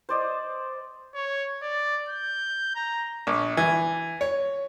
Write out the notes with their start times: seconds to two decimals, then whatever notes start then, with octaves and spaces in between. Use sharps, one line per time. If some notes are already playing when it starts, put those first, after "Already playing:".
0.09 C5 D5 D#5
1.15 C#5
1.63 D5
2.09 G6
2.76 A#5
3.27 A#1
3.57 E3
4.21 C#5